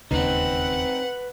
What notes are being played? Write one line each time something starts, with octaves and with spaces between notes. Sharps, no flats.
E1 D#2 C#3 C4 D#4 B4 F#5